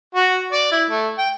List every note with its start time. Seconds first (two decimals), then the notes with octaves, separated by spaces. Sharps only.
0.15 F#4
0.52 D5
0.72 E4
0.90 A3
1.18 G5